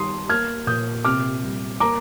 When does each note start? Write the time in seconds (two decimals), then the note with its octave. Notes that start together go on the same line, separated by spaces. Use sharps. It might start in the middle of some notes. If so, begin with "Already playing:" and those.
Already playing: D#3 G3 C6 D#6
0.29 A#3 F6 G#6
0.67 A#2 D#6 G6
1.05 C3 D6 F6
1.43 G3
1.80 A#3 A#5 D6